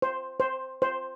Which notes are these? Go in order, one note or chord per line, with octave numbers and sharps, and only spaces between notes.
C5
C5
C5